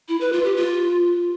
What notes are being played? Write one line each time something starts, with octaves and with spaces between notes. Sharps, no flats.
E4
B4
F4
G4
F4